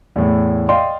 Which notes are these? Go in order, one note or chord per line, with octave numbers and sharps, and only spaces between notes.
E2 A2
D5 D#5 F5 G5 C6